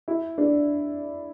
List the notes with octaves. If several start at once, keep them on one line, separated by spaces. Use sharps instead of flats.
E4
D4